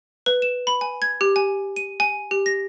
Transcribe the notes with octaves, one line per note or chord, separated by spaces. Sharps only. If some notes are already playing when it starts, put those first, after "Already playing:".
B4
E7
B5
G#5
G#6
G4
G#5
D#7
G#5
G4
A#6